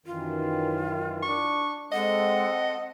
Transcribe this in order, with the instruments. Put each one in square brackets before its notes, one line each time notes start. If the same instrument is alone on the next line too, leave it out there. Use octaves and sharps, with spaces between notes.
[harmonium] F#2 D#3 E3 [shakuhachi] F4
[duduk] D4 [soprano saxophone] C#6
[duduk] G#3 [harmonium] C4 A4 [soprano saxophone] D#5 [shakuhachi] F#5